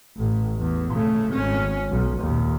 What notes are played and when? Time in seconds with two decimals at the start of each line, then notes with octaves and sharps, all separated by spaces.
0.17 A1 A2
0.59 E2
0.93 C#3 A3
1.32 G#1 C#4
1.90 B1
2.21 D#2 A#2